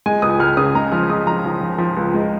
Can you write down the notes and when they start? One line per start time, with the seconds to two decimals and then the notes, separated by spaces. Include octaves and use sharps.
0.06 G#3 G#5
0.22 C#2 D#6
0.40 C#2 F6
0.57 C#3 D#6
0.75 G#3 A#5
0.92 F3 F6
1.09 G#3 D#6
1.27 F3 A#5
1.45 F3
1.61 F3
1.78 F3
1.97 C#2
2.14 G#3